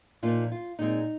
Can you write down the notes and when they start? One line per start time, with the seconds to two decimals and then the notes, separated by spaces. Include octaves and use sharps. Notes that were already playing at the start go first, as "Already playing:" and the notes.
0.23 A#2 F3 A#3 D#4 F4
0.52 F4
0.79 A#2 G#3 C4 D#4